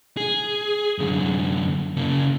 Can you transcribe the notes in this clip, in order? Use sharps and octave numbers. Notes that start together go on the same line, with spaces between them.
G#4
F#2 D3
C#3 A#3